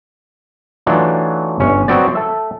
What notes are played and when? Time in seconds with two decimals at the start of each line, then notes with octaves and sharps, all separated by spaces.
0.86 E3 F#3 A3 D4 D#4 F4
1.60 G1 C#4 C#5
1.88 F#3 B3 C4 F#4 C5 D5
2.15 A4 E5